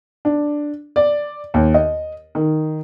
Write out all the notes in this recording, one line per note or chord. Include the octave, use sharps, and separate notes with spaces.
D4
D5
D#2
D#5
D#3